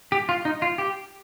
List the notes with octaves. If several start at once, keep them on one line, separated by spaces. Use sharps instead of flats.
G4
F4
D#4
F4
G4